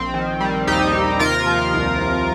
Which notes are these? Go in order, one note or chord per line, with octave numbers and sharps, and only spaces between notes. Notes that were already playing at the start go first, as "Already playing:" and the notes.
Already playing: A#1 C4
D#3
G3
D#2 D#4 G4
D#2
C3 F4 A#4
F3
C2
C2